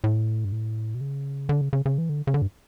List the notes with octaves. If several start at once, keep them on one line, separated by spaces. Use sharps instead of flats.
A2
G2
A2
B2
C#3
D3
C#3
C#3
C#3
E3
D3
C#3
D3
G2